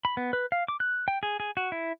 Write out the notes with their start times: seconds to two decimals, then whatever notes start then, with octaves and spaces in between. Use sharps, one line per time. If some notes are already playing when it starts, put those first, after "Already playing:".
0.05 B5
0.17 B3
0.33 B4
0.52 F5
0.68 D6
0.80 F#6
1.08 G5
1.23 G#4
1.40 G#4
1.57 F#4
1.72 E4